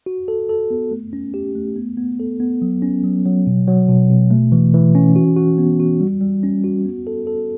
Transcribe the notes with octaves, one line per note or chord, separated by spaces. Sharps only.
F#4
A4
A4
B3
A3
C#4
G4
A3
B3
B3
A4
B3
F#3
C#4
F#3
F#3
B2
F#3
B2
B2
A3
E3
E3
C#4
F#4
F#4
B3
F#4
G3
G3
C#4
F#4
B3
A4
A4